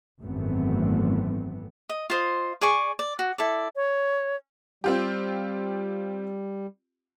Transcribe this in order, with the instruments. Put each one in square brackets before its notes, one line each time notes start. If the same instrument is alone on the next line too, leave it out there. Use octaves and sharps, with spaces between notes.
[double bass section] G#1 F#2 E3 A3 B3 C4
[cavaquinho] D#5
F4 C5 D#5
G#4 D5 G#5 C#6
D5
F#4
E4 A4 D5
[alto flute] C#5
[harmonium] G3 [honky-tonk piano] C4 F4 G4